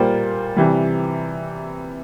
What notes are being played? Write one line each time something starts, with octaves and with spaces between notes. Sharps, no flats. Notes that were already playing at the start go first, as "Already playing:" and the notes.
Already playing: A#2 G3 A#3 F4 C5
C3 E3 G3